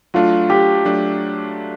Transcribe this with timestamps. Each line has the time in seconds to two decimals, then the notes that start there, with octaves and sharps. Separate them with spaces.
0.14 F#3 A3 D4 F4
0.50 G4
0.85 F#3 A3 D4